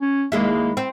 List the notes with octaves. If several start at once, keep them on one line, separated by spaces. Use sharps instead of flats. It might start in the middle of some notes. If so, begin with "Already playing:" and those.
C#4
D#2 G#3 A#3 E4
C4